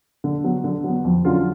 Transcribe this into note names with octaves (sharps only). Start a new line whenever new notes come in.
D3
F#3 B3
D3
F#3 B3
F2
D3 F#3 C#4 F4